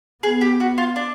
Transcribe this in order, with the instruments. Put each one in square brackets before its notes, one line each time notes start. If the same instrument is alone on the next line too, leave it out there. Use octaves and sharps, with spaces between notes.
[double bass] B3 [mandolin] G#4
[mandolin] G4
F#4
F4
D4